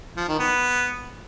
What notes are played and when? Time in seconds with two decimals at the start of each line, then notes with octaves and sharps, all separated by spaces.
0.17 F3
0.28 D#3
0.39 B3